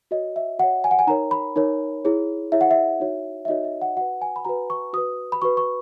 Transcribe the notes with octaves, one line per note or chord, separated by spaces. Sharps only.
F#4 C#5 D#5
E5
F#4 C#5 F#5
G#5
F#5
G#5
D#4 A#4 C#5 A#5
B5
D#4 A#4 C#5
E4 G#4 C#5
E4 G#4 C#5 E5
F#5
E5
D#4 F#4 C#5
E5
D#4 F#4 C#5 D#5
E5
F#5
F#4 B4 F#5
G#5
B5
F#4 B4 A#5
C#6
F#4 B4 D#6
B5
F#4 B4 C#6
C#6